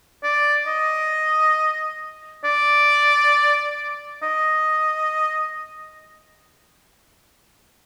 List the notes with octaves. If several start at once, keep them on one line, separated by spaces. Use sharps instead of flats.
D5
D#5
D5
D#5